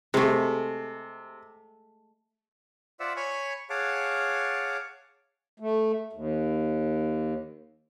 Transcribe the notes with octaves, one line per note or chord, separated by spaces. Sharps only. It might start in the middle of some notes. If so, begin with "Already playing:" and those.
C3 G#3 A3
F4 C5 D5 E5 F#5 E6
C#5 G#5 B5 C#6
G#4 C#5 F5 F#5 A5 D6
A3
D#2